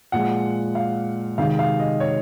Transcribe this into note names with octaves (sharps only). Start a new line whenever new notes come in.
A#2 F3 G#3 F#5
F5
C3 D#3 G#3 F5
F5
D#5
C#5